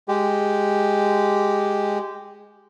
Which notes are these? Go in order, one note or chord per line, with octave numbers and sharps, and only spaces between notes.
G#3 G4